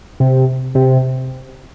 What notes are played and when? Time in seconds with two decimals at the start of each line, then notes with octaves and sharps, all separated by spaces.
0.20 C3
0.75 C3